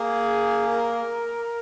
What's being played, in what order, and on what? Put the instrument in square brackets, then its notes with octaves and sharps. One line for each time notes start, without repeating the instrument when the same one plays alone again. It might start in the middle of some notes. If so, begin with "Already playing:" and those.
Already playing: [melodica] A#3 [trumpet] G#4
[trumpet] A#4